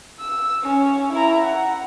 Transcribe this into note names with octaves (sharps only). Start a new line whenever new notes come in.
E6
C#4
E4 A#5
F#5